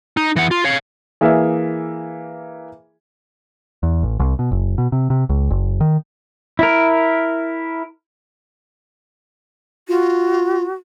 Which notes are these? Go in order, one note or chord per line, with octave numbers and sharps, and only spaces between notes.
D#4
E3 F#5
F4
C#5 F5
E3 A#3 G#4 E5
E2
A1
C2
B2
F#1
B2
C3
C3
C#2
F#1
D#3
E4 A#4
F4 F#4